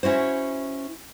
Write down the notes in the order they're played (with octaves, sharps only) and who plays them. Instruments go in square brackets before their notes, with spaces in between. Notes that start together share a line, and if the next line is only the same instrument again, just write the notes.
[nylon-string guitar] C#4 E4 F#4 C5